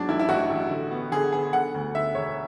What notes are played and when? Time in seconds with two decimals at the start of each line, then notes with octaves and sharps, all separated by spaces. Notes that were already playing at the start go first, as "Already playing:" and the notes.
Already playing: G#2 F#3 B3 D4
0.08 A1 E4
0.19 E4
0.29 A1 F#4
0.50 A1
0.70 D3
0.91 B3
1.12 D3 G#4
1.32 B3 G#4
1.53 D3 F#5
1.74 D2
1.95 D3 E5
2.15 E1 C#5